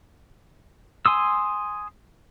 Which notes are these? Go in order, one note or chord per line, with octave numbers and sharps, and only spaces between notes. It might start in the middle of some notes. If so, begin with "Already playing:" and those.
G#5 C6 D#6 E6